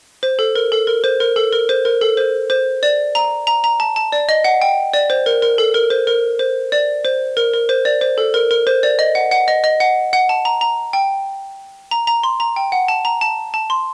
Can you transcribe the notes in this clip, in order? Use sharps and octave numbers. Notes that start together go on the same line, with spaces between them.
C5
A4
A#4
A4
A#4
C5
A#4
A4
A#4
C5
A#4
A4
C5
C5
D5
A#5
A#5
A#5
A5
A5
D5
D#5
F#5
G5
D5
C5
A#4
A#4
A4
A#4
C5
A#4
C5
D5
C5
A#4
A#4
C5
D5
C5
A4
A#4
A#4
C5
D5
D#5
F#5
F#5
D#5
D#5
F#5
F#5
A5
A#5
A#5
G5
A#5
A#5
C6
A#5
G5
F#5
A5
A#5
A5
A5
C6